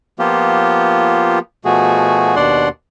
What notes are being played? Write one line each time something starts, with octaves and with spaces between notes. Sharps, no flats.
F3 A#3 B3 F4 G4
B2 F3 A3 F#4 G#4
D#2 B2 D4 D5 F#5 C6